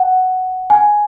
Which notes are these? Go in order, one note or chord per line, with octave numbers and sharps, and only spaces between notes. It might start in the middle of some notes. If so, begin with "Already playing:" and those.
Already playing: F#5
G#5